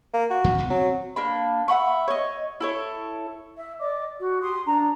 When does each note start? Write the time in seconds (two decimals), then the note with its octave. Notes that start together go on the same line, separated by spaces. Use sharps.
0.14 A#3
0.30 F#4
0.44 E2 A#2 D#3
0.58 C#2 B2
0.70 F#3 C4
1.16 A#3 D4 B5
1.68 E5 F#5 B5 C#6
2.08 C#5 D#5
2.60 E4 A4 C#5
3.56 E5
3.79 D5 D#5 D6
4.19 F#4
4.40 G4 C6 D#6
4.66 D4 A#5